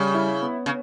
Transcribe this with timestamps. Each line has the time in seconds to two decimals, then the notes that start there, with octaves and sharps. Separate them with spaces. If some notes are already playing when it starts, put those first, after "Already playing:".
Already playing: C#3 G3
0.14 E4
0.42 B3
0.66 C#3